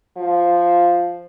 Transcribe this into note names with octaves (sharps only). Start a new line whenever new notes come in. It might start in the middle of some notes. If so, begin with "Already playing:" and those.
F3